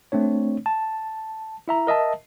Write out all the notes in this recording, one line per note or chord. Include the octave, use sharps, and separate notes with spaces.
A3 C4 D4 C#5
A5
E4 E5 A#5
A#4 D#5 E5 A5